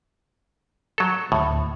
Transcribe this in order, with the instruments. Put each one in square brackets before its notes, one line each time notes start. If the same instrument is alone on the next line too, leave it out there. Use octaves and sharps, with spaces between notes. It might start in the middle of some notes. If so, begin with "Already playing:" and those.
[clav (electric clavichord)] F#3 A4
[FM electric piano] D2 [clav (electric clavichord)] A2